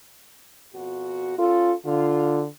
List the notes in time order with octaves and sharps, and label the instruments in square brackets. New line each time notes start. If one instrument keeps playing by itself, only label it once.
[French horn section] F2 B2 F#4
[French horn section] C#4 A4 [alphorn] F4
[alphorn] D3 [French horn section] F4